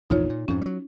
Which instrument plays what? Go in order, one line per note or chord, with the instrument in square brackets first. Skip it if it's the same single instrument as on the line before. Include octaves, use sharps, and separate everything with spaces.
[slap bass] A#1 E2 G#2 [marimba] D#4 F4 C#5
[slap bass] A#2
[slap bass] F2 G#2 [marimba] C#4
[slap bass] F#3 G3